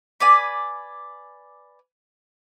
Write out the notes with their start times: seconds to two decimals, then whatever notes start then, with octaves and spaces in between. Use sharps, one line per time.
0.20 B4 D5 G#5